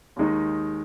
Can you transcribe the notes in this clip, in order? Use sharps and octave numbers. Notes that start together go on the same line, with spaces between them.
D#2 D#3 G#3 D#4